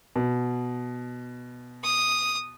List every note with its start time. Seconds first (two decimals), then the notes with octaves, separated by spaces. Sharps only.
0.16 B2
1.84 D#6